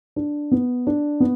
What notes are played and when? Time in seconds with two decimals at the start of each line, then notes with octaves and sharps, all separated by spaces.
0.16 D4
0.51 B3
0.87 D4
1.20 B3